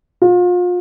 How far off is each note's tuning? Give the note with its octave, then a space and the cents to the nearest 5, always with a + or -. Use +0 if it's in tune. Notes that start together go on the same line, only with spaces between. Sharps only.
F4 +35